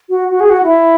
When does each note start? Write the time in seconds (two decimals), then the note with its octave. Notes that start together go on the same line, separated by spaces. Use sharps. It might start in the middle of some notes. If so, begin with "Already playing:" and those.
0.09 F#4
0.31 F#4
0.40 G#4
0.50 F#4
0.63 E4